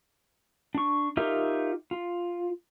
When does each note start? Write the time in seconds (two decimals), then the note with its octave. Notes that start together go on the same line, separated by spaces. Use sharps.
0.75 D4 C#6
1.17 D#4 F4 G4 A#4 E5
1.91 F4